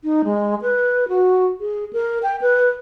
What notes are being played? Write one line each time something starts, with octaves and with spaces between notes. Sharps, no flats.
D#4
G#3
B4
F#4
G#4
A#4
G5
B4